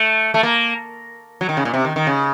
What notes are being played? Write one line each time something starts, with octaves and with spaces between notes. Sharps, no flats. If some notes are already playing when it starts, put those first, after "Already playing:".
Already playing: A3
A3
A#3
F#3
D#3
C#3
A#2
C3
D#3
D#3
C#3